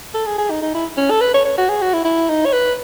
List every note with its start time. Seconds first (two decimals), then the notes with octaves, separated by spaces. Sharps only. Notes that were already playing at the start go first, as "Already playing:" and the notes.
0.14 A4
0.26 G#4
0.38 G#4
0.50 D#4
0.62 D#4
0.75 E4
0.97 C#4
1.10 A4
1.21 B4
1.34 C#5
1.45 C#5
1.58 F#4
1.69 G#4
1.82 F#4
1.93 E4
2.05 E4
2.30 D#4
2.46 C#5
2.53 B4